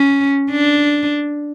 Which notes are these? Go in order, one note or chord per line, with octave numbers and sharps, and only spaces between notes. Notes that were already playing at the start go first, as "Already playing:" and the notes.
Already playing: C#4
D4